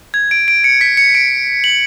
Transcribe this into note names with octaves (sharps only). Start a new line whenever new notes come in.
G#6
D7
D7
C#7
B6
C#7
D7
F#7